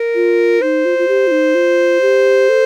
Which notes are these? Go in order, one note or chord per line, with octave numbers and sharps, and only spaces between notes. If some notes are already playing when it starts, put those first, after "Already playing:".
Already playing: A#4
F4
D#4 C5
F4
F4
G4
F4
D#4
F4
G4
A4